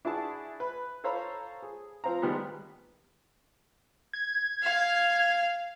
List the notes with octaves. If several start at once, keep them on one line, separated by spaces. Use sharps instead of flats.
D4 E4 F#4 G#4 A5
B4
A4 C5 C#5 F5 A#5 B5
G#4
F3 C4 F5 A#5
D#3 G3 G#3 B3
G#6
F5